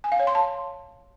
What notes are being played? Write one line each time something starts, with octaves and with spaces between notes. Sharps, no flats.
G#5
F5
C#5
C6
A5